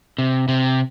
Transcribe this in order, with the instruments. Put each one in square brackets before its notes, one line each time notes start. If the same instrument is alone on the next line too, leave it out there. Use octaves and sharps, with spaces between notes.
[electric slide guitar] C3
C3